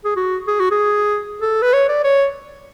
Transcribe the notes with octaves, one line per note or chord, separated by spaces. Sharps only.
G#4
F#4
G#4
F#4
G#4
A4
B4
C#5
D5
C#5